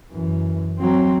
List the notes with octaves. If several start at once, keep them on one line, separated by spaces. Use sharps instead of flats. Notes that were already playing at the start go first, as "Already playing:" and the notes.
F#2 E3
F#3 C4